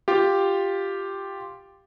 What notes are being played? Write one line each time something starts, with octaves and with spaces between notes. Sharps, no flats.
F4 G4